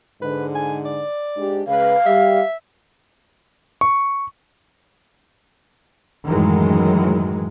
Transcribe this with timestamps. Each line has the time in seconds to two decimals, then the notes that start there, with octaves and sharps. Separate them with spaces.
0.22 G#2 D3 B4
0.55 G#5
0.85 D5
1.37 G#2 D4 G4
1.67 C#3 G#3 B4 F5
2.06 G3 G4 E5
3.81 C#6
6.26 F#2 A2 D#3 E3 F#3 G#3